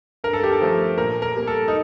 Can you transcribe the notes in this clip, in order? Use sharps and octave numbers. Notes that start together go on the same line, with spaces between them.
G2 A#4
A4
G4
A4
F3 A3
A#2 A#4
A#4
G3 A#3
A4
D#4